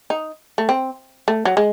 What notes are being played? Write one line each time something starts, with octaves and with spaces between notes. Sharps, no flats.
D#4
A3
C4
A3
F#3
G#3